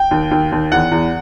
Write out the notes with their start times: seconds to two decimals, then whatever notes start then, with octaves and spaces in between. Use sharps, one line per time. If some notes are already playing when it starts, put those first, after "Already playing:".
Already playing: G5
0.11 D#2
0.31 D#2
0.52 D#2
0.72 E2 F#5
0.91 E2